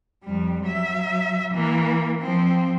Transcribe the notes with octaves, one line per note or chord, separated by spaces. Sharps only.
F2 G3
F#3 E5
E3 A#3
F3 C4